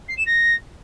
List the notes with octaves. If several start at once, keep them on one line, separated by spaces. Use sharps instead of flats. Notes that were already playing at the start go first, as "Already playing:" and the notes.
C7
E7
A#6